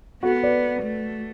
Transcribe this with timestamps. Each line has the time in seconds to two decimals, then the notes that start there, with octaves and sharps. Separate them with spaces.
0.22 B3 F#4 A4
0.43 B4 D5
0.82 A3